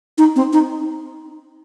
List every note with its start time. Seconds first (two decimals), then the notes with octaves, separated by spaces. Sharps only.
0.18 D#4
0.36 C4
0.53 D#4